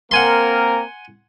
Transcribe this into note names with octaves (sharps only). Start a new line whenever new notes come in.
A#3 C4 A#4 F#5 G#5 C6